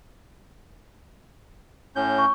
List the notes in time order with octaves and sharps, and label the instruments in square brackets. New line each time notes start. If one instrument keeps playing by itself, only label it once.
[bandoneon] A2 C#4 G6
[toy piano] C#6